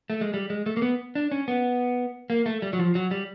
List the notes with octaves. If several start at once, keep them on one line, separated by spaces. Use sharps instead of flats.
A3
G#3
G3
G#3
A3
A#3
B3
D4
C#4
B3
A#3
A3
G3
F#3
F3
F#3
G3